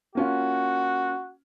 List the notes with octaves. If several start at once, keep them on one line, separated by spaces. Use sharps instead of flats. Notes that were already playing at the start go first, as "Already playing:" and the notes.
A#3 C#4 F4 F#4